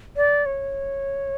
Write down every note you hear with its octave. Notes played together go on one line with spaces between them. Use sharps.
D5
C#5